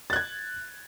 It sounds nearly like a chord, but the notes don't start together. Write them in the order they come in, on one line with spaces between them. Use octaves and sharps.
A6 F#6 G#6